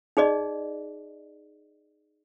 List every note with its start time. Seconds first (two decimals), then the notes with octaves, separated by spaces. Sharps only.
0.17 D#4 G#4 D5 D#5